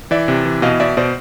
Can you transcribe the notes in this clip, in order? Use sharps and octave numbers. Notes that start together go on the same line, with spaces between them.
E3 D5 E5
C3
E3
B2 D#5 F5
B2 D5 E5
B2 C5 D5